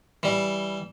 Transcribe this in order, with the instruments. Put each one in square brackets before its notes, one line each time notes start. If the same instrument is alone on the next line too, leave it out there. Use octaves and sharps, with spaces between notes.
[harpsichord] E3 G3